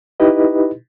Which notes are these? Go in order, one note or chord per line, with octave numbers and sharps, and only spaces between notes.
D#4 E4 G4 B4 D#5